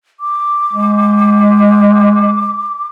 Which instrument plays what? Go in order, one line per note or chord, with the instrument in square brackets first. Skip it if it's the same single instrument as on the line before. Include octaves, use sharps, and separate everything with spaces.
[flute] D6
[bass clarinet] G#3